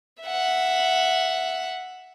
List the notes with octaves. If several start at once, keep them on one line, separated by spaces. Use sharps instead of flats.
E5 F#5